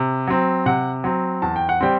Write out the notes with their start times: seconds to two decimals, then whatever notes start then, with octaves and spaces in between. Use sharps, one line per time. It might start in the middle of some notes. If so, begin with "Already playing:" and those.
Already playing: C3
0.27 F#3 C4
0.66 C3 F#5
1.04 F#3 C4
1.42 E2 A5
1.56 G5
1.69 F#5
1.81 G3 C4 G5